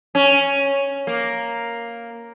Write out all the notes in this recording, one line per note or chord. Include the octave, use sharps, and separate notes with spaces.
C#4
A#3